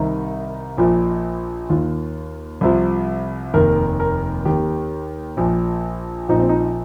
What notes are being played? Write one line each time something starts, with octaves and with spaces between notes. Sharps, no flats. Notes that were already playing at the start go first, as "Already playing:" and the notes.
Already playing: C2 C3 D#3 D#4
A#1 A#2 F3
D#2 D#3 F4
C2 C3 F3
F1 D#2 D#3 A#4
A#4
D#2 D#3 G4
A#1 A#2 F3
A#1 A#2 F3 D#4
C4
D#4